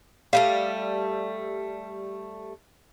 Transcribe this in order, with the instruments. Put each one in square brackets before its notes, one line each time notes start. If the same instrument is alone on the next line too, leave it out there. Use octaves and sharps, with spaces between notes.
[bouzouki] G3 A3 A4 [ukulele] F5